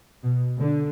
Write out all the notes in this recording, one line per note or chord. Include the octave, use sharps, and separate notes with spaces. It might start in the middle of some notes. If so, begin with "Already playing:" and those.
B2
D3